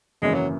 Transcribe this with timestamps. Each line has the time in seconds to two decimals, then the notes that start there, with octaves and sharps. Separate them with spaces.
0.22 G#1 F#2 C#3 E3 G#3 A#3
0.34 F#3